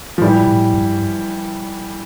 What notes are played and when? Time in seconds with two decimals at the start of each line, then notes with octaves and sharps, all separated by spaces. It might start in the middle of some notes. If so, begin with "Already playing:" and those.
0.18 F3
0.21 A2 E3 G3
0.42 A#2
0.47 A2
0.74 G2